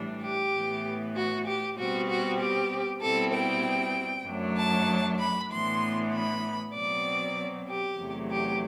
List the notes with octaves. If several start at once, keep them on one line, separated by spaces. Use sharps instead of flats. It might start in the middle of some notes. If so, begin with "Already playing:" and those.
Already playing: A2 E3 G3 D4
G4
A2 E3 B3
F#4
G4
B2 G3 C4 F#4
F#4
G4
B2 G3 C4 E4 A4
G5
F#2 F#3 A3 D4
A5
B5
A2 E3 B3 D4 C6
B5
B2 F#3 C4 D5
G4
E2 C3 F#3 A3
G4